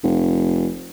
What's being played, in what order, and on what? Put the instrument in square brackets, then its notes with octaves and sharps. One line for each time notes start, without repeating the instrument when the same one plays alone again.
[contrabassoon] F1